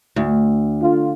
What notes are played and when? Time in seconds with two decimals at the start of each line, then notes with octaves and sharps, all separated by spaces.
0.16 D2
0.81 D3 F4